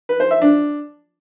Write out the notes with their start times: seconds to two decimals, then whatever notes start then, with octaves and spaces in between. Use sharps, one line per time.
0.09 B4
0.20 C5
0.31 E5
0.42 D4